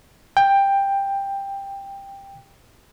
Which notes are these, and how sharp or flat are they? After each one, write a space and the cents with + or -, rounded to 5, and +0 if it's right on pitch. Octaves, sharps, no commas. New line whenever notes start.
G5 +10